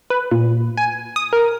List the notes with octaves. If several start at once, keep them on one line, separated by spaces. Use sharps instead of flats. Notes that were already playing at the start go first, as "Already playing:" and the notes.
B4
A#2
G#5
D#6
A#4